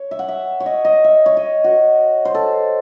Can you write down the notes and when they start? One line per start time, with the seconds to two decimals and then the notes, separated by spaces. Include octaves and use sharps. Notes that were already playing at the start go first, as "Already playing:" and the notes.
Already playing: C#5
0.11 E5
0.19 F#5
0.29 E5
0.60 C#5
0.66 D#5
0.85 D#5
1.04 E5
1.26 C#5
1.37 D#5
1.64 F#4
2.25 C5
2.35 A4